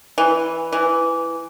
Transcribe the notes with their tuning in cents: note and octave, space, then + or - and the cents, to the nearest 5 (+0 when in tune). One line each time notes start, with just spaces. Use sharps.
E3 -5
E3 +10